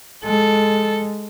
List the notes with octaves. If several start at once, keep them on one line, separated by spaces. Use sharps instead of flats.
G#3 A4